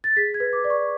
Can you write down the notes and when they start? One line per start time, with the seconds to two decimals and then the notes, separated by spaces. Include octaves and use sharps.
0.04 A6
0.17 G#4 B6
0.34 G#6
0.40 B4
0.53 D6
0.64 D5
0.70 C#6